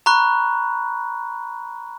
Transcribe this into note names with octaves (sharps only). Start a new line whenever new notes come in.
A#5 B5 C#6 F#6